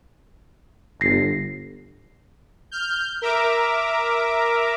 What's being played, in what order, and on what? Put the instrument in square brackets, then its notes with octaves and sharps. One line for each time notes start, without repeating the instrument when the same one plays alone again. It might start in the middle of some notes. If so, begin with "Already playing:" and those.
[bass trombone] G1 [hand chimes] A#6 C7
[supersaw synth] F6 G6
A#4 E5 A#5 D6